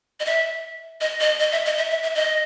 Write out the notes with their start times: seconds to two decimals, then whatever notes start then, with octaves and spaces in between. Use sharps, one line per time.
0.20 D#5
0.26 E5
1.01 D#5
1.20 D#5
1.40 D#5
1.52 E5
1.65 D#5
1.78 E5
1.90 E5
2.03 E5
2.15 D#5